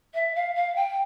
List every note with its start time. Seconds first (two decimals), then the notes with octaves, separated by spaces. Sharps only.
0.14 E5
0.35 F5
0.55 F5
0.75 G5